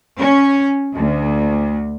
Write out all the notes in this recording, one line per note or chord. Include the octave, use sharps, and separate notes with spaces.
C#4
D2